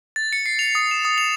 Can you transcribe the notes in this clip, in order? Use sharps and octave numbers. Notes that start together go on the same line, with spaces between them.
A6
C#7
C7
F7
D#6
E7
D#6
F7